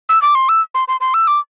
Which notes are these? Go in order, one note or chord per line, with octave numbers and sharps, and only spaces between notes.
E6
D6
C6
E6
C6
C6
C6
E6
D6